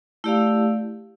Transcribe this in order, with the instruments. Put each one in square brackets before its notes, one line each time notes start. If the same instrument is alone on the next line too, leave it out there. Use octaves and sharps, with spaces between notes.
[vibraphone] A3 E4 G4 D5 F5